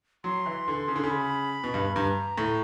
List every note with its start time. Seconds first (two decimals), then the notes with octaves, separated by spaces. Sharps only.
0.24 F#3 C6
0.46 E3
0.68 D3
0.88 C#3
0.96 D3
1.03 C#3
1.10 B5
1.64 B2
1.74 G2
1.96 G2 A#5
2.38 A2